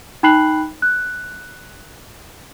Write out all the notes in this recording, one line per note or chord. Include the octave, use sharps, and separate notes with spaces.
D#4 G5 B5 F#6 C7 F#7
F#6